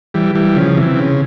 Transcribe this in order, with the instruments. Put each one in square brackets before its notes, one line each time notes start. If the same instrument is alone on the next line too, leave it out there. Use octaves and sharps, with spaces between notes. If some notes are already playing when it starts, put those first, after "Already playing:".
[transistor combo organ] E3 G3
E3 G3
C#3 F3
C3 E3
C#3